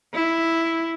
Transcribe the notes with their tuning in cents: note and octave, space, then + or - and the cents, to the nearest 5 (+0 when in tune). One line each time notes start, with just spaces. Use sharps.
E4 +0